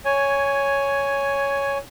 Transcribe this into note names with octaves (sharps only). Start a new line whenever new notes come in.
C#5 G#5